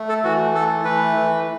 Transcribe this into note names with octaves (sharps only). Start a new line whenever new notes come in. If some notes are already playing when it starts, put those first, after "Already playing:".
Already playing: A3
A4
E3 F#4
A3 A4
E3 B4
E3